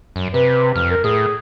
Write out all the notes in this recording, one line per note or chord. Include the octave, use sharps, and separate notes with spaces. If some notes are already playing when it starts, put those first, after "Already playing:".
F#2
C3 B4
F2 F6
A#4
A2 G#4